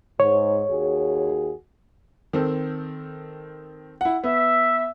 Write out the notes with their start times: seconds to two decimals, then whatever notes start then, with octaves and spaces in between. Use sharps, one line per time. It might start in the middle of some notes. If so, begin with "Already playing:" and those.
0.20 G#2 C#5
0.69 D#2 F#4 G#4
2.33 D#3 C4 A4
4.01 E4 F#5
4.24 B3 E5